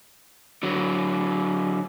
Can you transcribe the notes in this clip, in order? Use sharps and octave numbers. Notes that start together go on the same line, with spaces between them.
D3 F#3